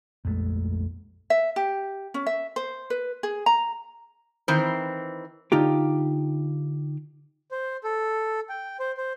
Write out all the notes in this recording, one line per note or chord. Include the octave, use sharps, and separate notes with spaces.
A#1 F2 G#3 A3
E5
G4
C#4
E5
C5
B4
G#4
A#5
D#3 E3 C4 C5
D3 D#4 F4 G4
C5
A4
G5
C5
C5